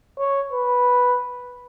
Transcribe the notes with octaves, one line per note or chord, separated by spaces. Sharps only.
C#5
B4